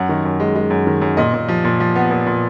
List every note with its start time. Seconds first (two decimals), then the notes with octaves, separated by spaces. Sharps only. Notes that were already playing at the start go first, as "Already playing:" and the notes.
Already playing: F#2 F#5
0.09 D#3
0.25 F#2
0.40 G#3
0.56 G#3
0.70 F#2
0.87 D#3
1.01 F#2
1.17 A#2 D#5
1.34 A#2
1.48 F3
1.64 A#2
1.80 F3
1.96 B3
2.11 A#2
2.26 A#2